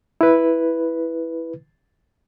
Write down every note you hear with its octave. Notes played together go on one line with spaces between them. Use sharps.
E4 B4